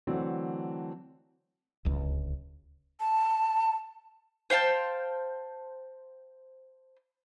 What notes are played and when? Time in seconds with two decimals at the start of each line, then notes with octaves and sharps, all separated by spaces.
0.07 D3 E3 F#3 A3 C4 D4
1.85 D1 C#2
3.00 A5
4.50 C5 F5 G5 A5